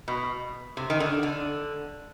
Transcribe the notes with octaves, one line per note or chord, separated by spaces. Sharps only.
B2
C3
D#3
D3
D3